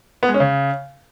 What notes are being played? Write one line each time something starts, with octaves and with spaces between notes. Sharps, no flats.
B3
G#3
C#4
C#3